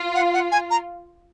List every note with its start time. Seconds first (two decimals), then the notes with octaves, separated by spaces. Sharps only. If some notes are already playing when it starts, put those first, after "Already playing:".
Already playing: F4
0.15 F#5
0.34 F#5
0.52 G#5
0.71 A#5